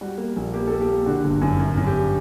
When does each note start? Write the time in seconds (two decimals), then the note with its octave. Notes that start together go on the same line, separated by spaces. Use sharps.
0.01 G3 F#4
0.18 A#3
0.36 A#1
0.53 A#3 G4
0.67 A#3 A4
0.81 G4
0.89 A#3
1.06 D3 F#4
1.24 G1
1.41 F#2
1.60 F#2
1.77 F#2
1.87 G4